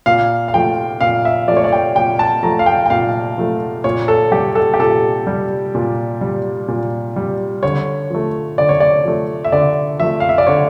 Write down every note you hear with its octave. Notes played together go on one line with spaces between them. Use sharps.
A#2 F5
F5
F3 A3 G5
A#2 F5
E5
F3 A3 D5
C#5
D5
G5
A#2 G5
A5
F3 A3 A#5
F5
G5
G5
A#2 F5
F3 A3
A#2 C#5
A4
G3 G4
A4
G4
A#2 A4
G3
A#2
G3
A#2
G3
D3 C#5
F3 A3
D3 D5
C#5
D5
F3 A3
E5
D3 D5
F3 A3 E5
F5
E5
D5
D3 C#5